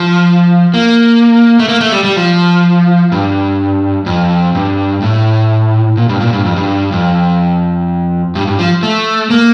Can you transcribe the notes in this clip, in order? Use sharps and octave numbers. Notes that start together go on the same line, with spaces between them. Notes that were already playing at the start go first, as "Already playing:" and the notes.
Already playing: F3
A#3
A3
A#3
A3
G3
G3
F3
G2
F2
G2
A2
A#2
G2
A#2
G2
F2
G2
F2
G2
G2
F3
A3
A#3